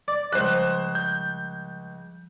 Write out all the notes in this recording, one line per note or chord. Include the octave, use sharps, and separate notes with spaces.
D5
C#2 F3 G3 C5 F#6
G6